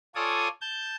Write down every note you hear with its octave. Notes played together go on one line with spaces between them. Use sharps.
F4 A4 C#5 D5 G#5 D#6
A5 G6